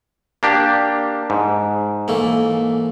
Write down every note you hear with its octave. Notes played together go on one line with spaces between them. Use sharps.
A#3 D4 G4
G#2
E3 A3 A#3